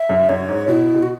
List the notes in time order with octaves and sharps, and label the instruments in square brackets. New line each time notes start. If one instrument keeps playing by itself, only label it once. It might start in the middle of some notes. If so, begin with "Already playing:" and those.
Already playing: [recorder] E5
[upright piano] F#2
[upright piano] F#2 [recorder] C#5
[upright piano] G#2
[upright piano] B2 [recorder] E4
[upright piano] B2
[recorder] F#4